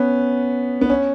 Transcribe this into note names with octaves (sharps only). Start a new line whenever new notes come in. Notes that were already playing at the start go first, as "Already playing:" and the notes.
Already playing: B3 C#4
B3
C#4